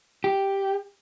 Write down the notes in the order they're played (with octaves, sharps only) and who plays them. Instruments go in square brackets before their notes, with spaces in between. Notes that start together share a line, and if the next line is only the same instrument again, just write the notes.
[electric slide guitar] G4